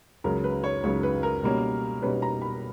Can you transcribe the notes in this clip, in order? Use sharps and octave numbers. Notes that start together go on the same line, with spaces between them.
C#2 C#3 F#3 A#4
B4
C#5
C#2 C#3 F#3 C#5
B4
A#4
B2 G3 A#3 C#4
B2 G3 A#3 C#4 B4
A#5
B5